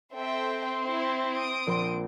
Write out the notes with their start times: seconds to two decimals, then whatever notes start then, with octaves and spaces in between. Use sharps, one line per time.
0.15 C4 A4 C5 E5 G5
0.86 E4
1.34 D#6 D7
1.67 A#1 C6